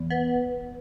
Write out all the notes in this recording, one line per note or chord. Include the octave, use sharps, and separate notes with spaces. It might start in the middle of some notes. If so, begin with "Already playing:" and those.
Already playing: E2
B3